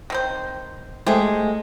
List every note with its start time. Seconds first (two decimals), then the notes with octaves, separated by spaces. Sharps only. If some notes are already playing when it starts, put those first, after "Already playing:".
0.10 D#3 C4 C5
1.06 G#3 A3 G4 G#4 C5 G#5